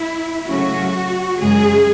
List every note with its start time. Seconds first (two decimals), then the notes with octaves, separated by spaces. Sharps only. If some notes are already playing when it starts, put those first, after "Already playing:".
Already playing: E4
0.47 C#3 F#3 A3 C#4 F#4
1.40 F#2 C#3 G#3 G#4